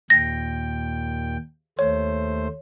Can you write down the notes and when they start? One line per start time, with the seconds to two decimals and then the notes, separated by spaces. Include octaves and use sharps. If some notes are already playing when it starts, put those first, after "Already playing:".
0.10 D#2 A#2 G5 A#6
1.79 D#2 A3 C5 C#5